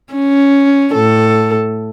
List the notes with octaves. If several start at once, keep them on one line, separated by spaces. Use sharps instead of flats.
C#4
A2 A4